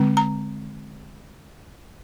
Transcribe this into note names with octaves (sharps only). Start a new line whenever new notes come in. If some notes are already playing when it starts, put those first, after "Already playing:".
Already playing: D3 G#3 C4
A#5